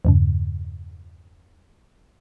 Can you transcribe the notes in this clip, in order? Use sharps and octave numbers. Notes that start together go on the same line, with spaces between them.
E2 G2 C#3